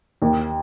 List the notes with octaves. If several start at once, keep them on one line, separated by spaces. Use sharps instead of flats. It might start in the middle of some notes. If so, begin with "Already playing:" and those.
D#2